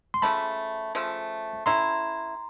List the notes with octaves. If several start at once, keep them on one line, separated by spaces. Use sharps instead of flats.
C6
C#3 F3 A3 A5 B5
C#3 F3 A3
A3 C#4 E4 A#5 C6